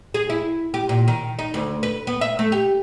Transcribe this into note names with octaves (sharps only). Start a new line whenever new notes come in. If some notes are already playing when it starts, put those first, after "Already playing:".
G#4
E4
G4
A#2
D#3
D#4
D2
B4
B3
E5
A3
G4